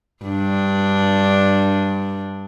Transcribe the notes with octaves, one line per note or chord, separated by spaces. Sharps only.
G2 D4